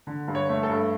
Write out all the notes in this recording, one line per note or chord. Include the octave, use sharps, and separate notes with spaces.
D3
G2
C#5
A3
A4
G2